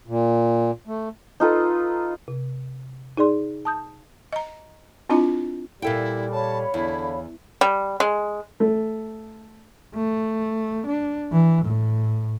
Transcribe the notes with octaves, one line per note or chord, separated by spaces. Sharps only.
A#2
A3
D#4 F4 A4 B4
C3
D#4 G#4 D5 C6
A5 D#6 G6
D#5 A#5
C4 D4 E4 F4 D#5 A#5
A#2 G3 E4 A4 G5
C#5 F5 A5 B5
E2 D3 E4
G3
G#3
A3
A3
D4
E3
A2